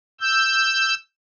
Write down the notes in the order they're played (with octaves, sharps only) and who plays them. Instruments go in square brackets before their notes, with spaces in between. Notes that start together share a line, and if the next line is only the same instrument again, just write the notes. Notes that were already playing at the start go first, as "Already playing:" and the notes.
[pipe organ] E6 G6